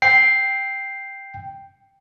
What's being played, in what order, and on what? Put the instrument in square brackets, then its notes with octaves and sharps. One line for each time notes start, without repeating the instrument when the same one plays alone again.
[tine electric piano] G5 C7